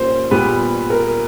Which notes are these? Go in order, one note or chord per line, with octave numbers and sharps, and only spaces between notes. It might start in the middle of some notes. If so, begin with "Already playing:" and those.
Already playing: A#2 G3 A#3 C#4 C5
A#2 G3 B3 B4
A#4